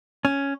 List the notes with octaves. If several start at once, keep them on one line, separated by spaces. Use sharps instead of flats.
C#4